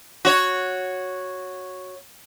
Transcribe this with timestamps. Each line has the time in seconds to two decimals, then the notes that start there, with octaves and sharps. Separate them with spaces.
0.25 F#4 C#5